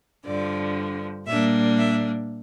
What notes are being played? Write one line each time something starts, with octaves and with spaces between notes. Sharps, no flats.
G2 D3 F3 D5
A#2 G3 A#3 D4 E5
E5